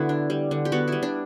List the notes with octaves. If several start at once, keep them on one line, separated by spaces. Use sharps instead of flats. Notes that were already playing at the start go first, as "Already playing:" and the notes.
Already playing: D3 B3 E4 F#4
D4
G3
D3
G4
B3 F#4
G3 E4
D4